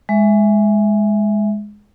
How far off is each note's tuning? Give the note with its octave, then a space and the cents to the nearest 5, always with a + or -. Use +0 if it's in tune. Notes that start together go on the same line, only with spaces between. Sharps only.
G#3 +0 E5 +5